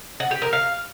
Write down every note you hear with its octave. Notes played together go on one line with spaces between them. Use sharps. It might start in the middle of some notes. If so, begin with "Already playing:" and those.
F#5
G4
A#4
F5